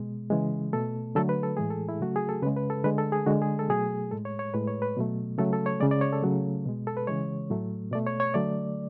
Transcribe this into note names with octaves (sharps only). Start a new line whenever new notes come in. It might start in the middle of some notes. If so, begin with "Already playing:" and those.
Already playing: B2 G#3
C#3 E3 G#3
B2 A3 A4
D3 F#3 A3 A4
B4
A4
A2 E3 G#3 G#4
A4
E4
C#3 F#3 A3 F#4
G#4
A4
C#3 G#3 B4
B4
A4
D3 G#3 B4
A4
G#4
D3 G#3 F#4
G#4
A4
B2 F#3 A3 G#4
A2 G#3 A4
C#5
C#5
A2 G#3 B4
C#5
B4
B2 F#3 A3
C#3 F#3 A3 A4
A4
C#5
C#3 G#3 D5
D5
C#5
A4
C#3 F#3 A3
B2 G#3
A4
B4
C#3 E3 G#3 C#5
A2 F#3 A3
B2 A3 D5
C#5
C#5
D3 F#3 A3 D5